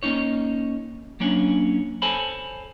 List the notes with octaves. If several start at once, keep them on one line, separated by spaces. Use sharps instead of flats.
A#3 C#4 D#4 C#5
F#3 A#3 C#4 D4
A4 C5 C#5 G#5 A5 B5